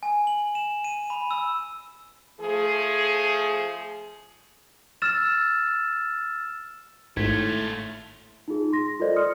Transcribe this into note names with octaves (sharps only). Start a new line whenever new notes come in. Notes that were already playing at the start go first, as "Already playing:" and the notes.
G#5
F#7
E7
D#7
B5
E6
F3 A3 G#4
E6 F6 A6 E7
G#1 A2 A3 F4 G#6 B6
D#4 F4 G#4
C6 A#6
F4 A4 A#4 C5 D5 D#5
C6 D#6 F6 C#7